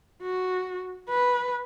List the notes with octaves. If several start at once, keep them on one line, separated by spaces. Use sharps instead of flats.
F#4
B4